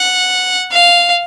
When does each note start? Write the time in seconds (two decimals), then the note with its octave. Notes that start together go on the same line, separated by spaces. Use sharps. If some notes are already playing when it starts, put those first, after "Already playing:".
Already playing: F#5
0.72 F5